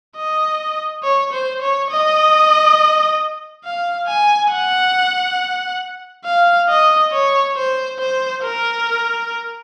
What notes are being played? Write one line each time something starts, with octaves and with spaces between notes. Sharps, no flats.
D#5
C#5
C5
C#5
D#5
F5
G#5
F#5
F5
D#5
C#5
C5
C5
A#4